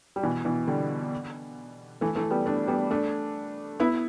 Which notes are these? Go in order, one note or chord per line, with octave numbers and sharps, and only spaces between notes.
G3
B2 E3
B2 E3
D3 G3
E3 A3
E3 A3
G3 B3
A3 D4
G3 B3
A3 D4
B3 E4